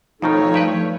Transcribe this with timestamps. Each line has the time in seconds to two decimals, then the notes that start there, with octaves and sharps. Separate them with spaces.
0.22 F2 B2 D#3 F3 A3 D#4 C#5
0.54 G2 G4 B4